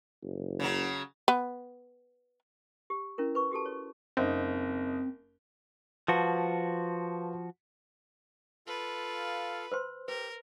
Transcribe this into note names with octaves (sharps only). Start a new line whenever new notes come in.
F#1
C#3 F#3
B3
G4
C#4 E4 A#4
B4 C#6
F#4 G4 A4 A5
C#5
F#1 C4 D#4
F3 F#4 B4 F5 A5
F4 A4 B4 F5
B4 C5 C6
G4 A#4 B4